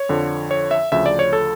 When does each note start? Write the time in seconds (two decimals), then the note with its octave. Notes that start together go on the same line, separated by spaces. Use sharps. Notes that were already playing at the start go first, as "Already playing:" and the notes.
Already playing: C#5
0.09 F2 D3 F3
0.51 C#5
0.71 E5
0.92 D2 C#3 F3 E5
1.06 D5
1.19 C#5
1.33 A4